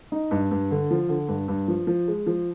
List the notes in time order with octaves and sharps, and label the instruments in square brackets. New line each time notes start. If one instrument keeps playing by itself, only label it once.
[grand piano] D#4
G2
G2
D3
F3
D3
G2
G2
F3
F3
G#3
F3